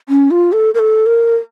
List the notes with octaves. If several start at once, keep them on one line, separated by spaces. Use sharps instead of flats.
C#4
F4
A4
A#4
A4
A#4